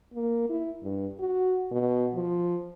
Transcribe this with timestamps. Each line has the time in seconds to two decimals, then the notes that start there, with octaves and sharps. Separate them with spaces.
0.14 A#3
0.50 E4
0.83 G2
1.19 F#4
1.72 B2
2.15 F3